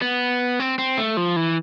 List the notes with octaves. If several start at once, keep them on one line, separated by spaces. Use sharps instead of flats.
B3
C4
C4
A3
F3
E3